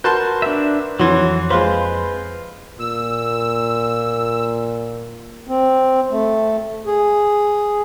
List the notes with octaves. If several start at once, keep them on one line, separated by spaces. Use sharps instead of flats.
F#4 A#4 B4 A5 C6 G6
D4 E5
F2 E3 F#3 F#4 C#5 C6
G#3 F4 B4 C5 C6
A#2 E6
C4
A3
G#4